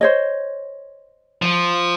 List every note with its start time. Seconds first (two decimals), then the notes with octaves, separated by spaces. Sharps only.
0.01 C5 C#5 D#5
1.42 F3